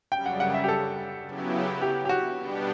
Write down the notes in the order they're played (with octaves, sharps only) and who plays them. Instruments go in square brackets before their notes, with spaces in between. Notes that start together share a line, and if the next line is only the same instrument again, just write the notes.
[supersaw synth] F#2 C#3 G3 [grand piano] G5
[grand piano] F#5
F#5
E5
G4
A4
[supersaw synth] C#3 F#3 B3 E4 G4
[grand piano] G4
G4
F#4
[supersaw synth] B2 G3 B3 D4 G4